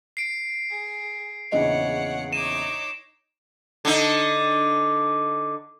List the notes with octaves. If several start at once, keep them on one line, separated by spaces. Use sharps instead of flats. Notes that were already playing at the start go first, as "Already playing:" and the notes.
C7 D7
G#4
A#1 E2 C#3 C#5 D#5 F#5
D#4 C#5 D6 D#7 E7
D3 D#4